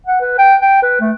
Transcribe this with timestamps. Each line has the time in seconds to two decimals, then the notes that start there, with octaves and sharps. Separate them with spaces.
0.07 F#5
0.21 B4
0.38 G5
0.62 G5
0.82 B4
1.00 A3